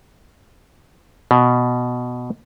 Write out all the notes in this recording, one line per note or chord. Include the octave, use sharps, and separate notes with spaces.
B2